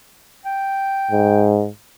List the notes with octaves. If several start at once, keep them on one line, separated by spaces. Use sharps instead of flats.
G5
G#2